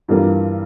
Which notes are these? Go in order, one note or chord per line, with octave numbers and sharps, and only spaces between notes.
G2 E3 G3 A#3 F4